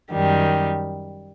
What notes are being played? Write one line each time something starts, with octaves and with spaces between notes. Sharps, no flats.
F#2 D#3 G3